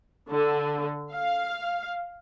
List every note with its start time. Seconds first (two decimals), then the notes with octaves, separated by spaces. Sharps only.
0.29 D3
1.12 F5